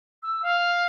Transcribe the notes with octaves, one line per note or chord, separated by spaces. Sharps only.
E6
F5